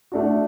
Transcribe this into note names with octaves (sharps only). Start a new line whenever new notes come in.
A3 D4 F#4